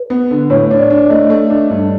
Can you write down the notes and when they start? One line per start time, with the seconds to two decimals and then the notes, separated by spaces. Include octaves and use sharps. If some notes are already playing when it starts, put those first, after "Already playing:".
Already playing: B4
0.10 B3
0.31 D3
0.50 A2 C#5
0.71 D4
0.80 D5
0.90 D4
1.10 A3 D#5
1.30 A3
1.50 D4
1.70 G2